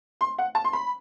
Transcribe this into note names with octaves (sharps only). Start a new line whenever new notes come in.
C6
F#5
A5
C6
B5